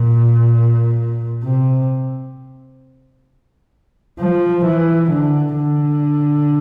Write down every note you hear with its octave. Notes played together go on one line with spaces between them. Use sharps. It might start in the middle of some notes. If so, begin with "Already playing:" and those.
Already playing: A#2
C3
F3
E3
D3
D3